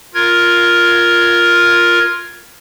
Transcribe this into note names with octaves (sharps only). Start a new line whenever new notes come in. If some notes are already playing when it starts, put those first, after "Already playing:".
F4 A#4 G#6